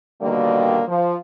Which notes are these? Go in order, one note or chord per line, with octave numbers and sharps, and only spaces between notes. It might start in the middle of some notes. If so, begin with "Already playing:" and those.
B2 D3 D#3 G3 A#3
F3